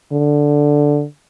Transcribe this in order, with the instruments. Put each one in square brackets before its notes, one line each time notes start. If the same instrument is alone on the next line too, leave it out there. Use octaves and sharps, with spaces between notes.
[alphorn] D3